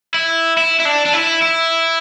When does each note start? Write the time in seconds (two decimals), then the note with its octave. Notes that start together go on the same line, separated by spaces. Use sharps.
0.14 E4
0.57 E4
0.80 E4
0.85 D4
1.06 D4
1.14 E4
1.42 E4